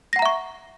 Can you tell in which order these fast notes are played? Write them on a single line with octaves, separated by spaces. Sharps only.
A#6 F#5 A#5 E5 C#6